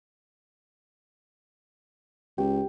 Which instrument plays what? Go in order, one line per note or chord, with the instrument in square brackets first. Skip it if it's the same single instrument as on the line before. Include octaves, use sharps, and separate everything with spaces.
[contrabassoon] C#2 [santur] G4